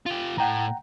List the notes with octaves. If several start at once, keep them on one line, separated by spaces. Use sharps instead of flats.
F4 G4
A2 F#5 G5 A#5